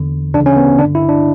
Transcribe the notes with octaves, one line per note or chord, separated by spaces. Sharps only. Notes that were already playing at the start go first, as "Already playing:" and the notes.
Already playing: E2 D3
D2 C#3 E3 D4
C#4
B3
G2 D3 D4
E4
D4